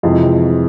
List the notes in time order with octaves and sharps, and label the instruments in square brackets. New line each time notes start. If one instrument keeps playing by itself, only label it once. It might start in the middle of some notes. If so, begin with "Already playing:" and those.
[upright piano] F2 C3 E3 G#3 C4